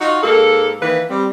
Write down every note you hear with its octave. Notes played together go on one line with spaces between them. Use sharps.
D#4 F4 F#4
G#2 A#3 A4
D#3 E3 A#3 B4
G3 C4